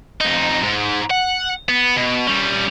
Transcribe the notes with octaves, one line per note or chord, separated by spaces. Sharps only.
F2 D#4
G#2
F#5
B3
B2
G3 C#4